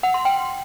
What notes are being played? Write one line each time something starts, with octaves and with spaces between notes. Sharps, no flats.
F#5
C6
G5